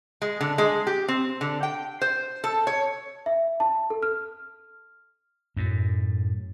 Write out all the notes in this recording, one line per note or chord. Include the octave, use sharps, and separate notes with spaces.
G#3
D3
G#3
G4
C4
D3
G5
C5
A4
C#5
E5
A5
A4
F6
F#2 A2